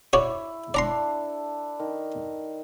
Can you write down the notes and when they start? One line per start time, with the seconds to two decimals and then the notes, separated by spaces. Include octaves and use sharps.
0.13 E4 F#4 C#5 D5
0.74 D4 E4 A4 D5 A#5 C6
1.80 D#3